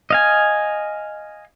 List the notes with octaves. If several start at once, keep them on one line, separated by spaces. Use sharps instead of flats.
D#5 F5 G#5